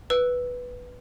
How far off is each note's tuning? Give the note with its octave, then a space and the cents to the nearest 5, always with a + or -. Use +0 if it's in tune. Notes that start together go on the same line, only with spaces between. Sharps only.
B4 +0 E6 +0